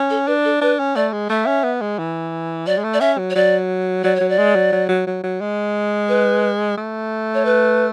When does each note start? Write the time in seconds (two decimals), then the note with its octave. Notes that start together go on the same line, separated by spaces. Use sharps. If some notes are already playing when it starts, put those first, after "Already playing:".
Already playing: C#4
0.10 A4
0.27 D4 B4
0.45 A4
0.61 D4 B4
0.79 C#4
0.96 A3 D5
1.13 G#3
1.30 A3 E5
1.47 C#4
1.64 B3
1.81 G#3
1.99 E3
2.66 F#3 D5
2.77 G#3
2.84 A3
2.94 D5
3.01 C#4 E5
3.18 F#3
3.30 C#5
3.35 F#3 D5
4.04 F#3 D5
4.16 C#5
4.21 F#3
4.29 D5
4.38 G#3
4.55 F#3
4.72 F#3
4.89 F#3
5.07 F#3
5.23 F#3
5.41 G#3
6.09 B4
6.78 A3
7.34 C#5
7.45 B4